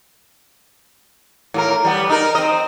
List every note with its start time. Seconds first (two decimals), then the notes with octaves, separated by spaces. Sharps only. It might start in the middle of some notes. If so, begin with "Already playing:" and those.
1.54 A2 F4 A#4
1.85 G3 B3
2.09 D#4 A#4
2.35 C4 D#5